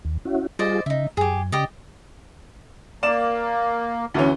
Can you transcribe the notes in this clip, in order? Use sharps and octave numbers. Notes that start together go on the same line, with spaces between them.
D#2
C#4 E4 F#4
G3 F4 G#4 C5 D5 D#5
C#3 D#4 E5
F#2 G4 G#4
C#3 G4 D5 D#5
A#3 D5 E7
D2 E3 C#4